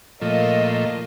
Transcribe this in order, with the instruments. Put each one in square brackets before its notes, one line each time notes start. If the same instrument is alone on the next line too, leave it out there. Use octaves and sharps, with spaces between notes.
[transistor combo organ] A#2 F3 A3 [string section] A#4 D#5 F5